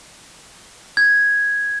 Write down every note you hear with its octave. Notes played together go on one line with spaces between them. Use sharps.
G#6